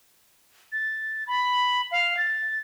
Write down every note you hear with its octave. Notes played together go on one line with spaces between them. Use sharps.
A6
B5
F5
A6